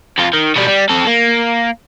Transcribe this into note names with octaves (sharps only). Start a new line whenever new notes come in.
F2 F4
D#3
B2 G3
G3
C4 A4
A#3